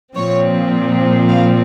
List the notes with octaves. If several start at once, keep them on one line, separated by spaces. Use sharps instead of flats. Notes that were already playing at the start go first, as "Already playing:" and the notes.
A#2 F3 C4 C#5
F5